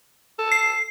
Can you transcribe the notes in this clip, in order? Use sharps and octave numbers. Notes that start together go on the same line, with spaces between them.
A4
C7